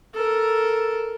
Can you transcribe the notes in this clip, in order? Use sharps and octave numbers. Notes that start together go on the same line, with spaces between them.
A4 A#4